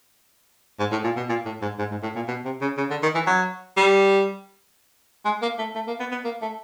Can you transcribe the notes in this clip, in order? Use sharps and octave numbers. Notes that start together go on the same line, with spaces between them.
G#2
A2
A#2
B2
A#2
A2
G#2
G#2
G#2
A2
A#2
B2
C3
C#3
C#3
D3
D#3
E3
F#3
G3
G#3
A#3
A3
A3
A#3
B3
B3
A#3
A3